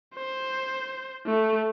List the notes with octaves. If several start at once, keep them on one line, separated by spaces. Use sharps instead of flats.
C5
A3